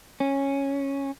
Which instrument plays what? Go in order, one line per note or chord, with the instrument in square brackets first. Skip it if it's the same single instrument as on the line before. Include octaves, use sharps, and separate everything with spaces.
[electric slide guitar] C#4